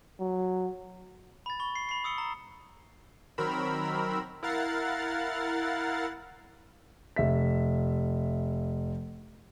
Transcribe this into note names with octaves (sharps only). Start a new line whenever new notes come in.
F#3
B5 A6
B5 C#6 G7
C7
B5 C7
D#6 E6 C#7 G7
A#5
D#3 F#3 C4 A#4 B5 E6
E4 A#4 F5 F#5 A6 C7
F1 E5 B6